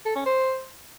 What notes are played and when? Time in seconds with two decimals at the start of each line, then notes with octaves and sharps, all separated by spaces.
0.06 A4
0.16 C#4
0.26 C5